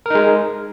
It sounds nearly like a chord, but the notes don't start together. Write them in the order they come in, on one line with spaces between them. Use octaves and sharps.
A#4 D#4 G#3